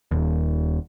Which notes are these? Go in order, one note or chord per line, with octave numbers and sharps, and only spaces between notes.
D#1 D#2